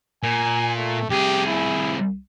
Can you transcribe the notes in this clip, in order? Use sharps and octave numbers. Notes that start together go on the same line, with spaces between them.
A#2 G#5
A3
C2 G4 G#4
E4